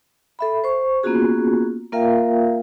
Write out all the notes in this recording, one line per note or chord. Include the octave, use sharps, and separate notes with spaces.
A4 E5 B5
C5 C#6
A#3 B3 C#4 F4 F#4 G#4
A#3 F4 A#4 E5 F5 G5